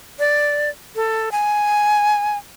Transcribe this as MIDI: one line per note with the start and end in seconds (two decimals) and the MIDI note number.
0.19 0.70 74
0.96 1.29 69
1.32 2.37 80